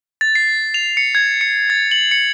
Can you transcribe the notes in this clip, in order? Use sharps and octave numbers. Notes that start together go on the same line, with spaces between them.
A6
C7
F7
C#7
G#6
C#7
A6
F#7
C#7